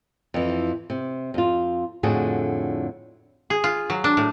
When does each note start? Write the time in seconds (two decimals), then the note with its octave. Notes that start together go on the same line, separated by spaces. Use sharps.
0.34 F2 E3
0.90 C3
1.34 F2 F4
2.03 F2 A2 D3 D4 F#4 G#4
3.50 G#4
3.64 F4
3.90 F#3
4.04 D4
4.17 A2